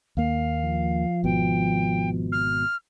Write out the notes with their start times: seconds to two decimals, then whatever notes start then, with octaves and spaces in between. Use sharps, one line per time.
0.17 D#2 A#3 F5
0.64 F3
1.24 G#1 B2 G5
2.32 F6